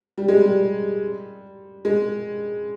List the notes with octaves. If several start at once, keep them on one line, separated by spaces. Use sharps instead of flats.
G3
G#3
G3
G#3